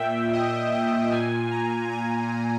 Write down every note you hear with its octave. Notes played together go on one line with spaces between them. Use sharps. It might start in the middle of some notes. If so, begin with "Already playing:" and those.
Already playing: A#2 E5 G5
D#5
G5
A#2 G#5
A#5
G#5